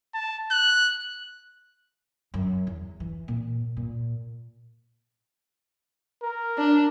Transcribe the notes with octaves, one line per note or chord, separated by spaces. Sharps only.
A5
F#6
F#2
E2
E3
A#2
A#2
A#4
D4